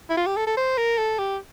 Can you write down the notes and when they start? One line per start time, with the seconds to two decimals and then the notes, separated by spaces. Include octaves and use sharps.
0.10 E4
0.17 F4
0.26 G4
0.37 A4
0.47 A4
0.57 C5
0.78 A#4
0.98 A4
1.19 G4